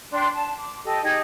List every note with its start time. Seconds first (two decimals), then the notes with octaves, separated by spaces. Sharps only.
0.12 D4 G5 C6
0.34 A5
0.58 D6
0.84 G4 A4 D#5
1.03 D#4 G4 G#4 D#5